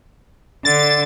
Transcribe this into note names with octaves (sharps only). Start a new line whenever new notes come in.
D3 A6